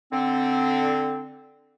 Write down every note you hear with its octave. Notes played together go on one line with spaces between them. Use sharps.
D3 C4